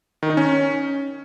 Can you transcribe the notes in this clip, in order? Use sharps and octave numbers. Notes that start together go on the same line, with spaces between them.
D#3
D#4
C#4